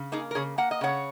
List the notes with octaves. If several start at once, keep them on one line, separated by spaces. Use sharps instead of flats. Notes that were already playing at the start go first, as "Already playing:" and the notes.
Already playing: C#3
A#3 D#4 G#4
A#4
C#3 G#4 C#5
A#3 F#5
D#5
C#3 C#5 F#5